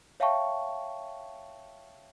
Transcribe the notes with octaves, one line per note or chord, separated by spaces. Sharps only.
C#5 E5 F5 G5 A5 C#6